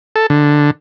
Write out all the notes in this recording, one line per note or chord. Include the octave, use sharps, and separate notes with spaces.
A4
D3